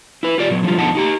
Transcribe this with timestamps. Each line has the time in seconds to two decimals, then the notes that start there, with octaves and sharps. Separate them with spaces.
0.23 E4 B4
0.38 F4 G4 D5
0.50 A#2 F#3
0.63 D3 F3 G3 F4
0.78 F2 B2 D3 D#4 F#5 A5
0.95 D#4 G4 A#5